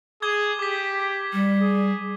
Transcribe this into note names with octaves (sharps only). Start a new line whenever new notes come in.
G#4 D6 G#6 G7
G4 D6 B6
G3
G#4